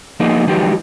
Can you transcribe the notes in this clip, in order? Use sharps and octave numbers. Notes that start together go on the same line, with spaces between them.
F3 A#3 B3 D#4 G#4 D#5
D#3 F3 F#3 G#3 G4 B4